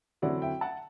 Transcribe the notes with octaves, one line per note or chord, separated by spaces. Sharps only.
D3 F#3 C4 E4 D5 F#5
E5 G5
F#5 A5